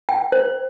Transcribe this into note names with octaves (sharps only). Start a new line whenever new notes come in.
G5
C5